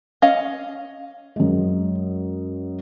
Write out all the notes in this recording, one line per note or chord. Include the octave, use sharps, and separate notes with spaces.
C#4 D#5 F5
F#2 G#3